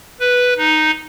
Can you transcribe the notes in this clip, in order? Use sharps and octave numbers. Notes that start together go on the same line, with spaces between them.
B4
D#4